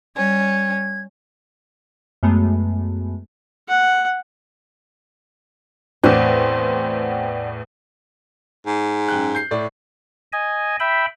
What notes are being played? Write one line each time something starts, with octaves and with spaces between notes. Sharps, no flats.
G3 C#4 G#6
F#2 G#3 A3 B3
F#5
E2 A2 C4 D5 F#5 G5
G#2
F#2 G5 F#6
G6 C7
A2 D5
D#5 G#5
E5 G5 B5